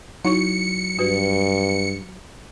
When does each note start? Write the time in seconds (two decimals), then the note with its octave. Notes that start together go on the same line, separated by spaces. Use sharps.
0.25 F#3 D#4 E4 C#6 C#7
0.99 G2 F#4 B4